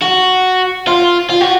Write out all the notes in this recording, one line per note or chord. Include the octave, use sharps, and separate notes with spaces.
F#4
F4
F4
F#4